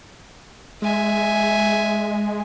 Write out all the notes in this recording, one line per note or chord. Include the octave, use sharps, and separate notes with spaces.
G#3 E5 G#5